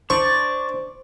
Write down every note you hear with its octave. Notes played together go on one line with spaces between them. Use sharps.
D4 C5 D5 C#6